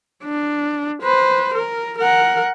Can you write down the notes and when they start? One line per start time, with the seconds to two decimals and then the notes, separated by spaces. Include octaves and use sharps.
0.24 D4
1.03 B4 C5
1.54 A#4
1.98 A#4 F#5